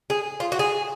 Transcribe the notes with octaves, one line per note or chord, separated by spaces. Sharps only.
G#4
F4
F#4
G#4